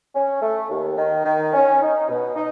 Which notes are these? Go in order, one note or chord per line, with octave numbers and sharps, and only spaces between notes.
C#4
A3
D#2
D#3
D#3
C#4
D#4
B2
D#4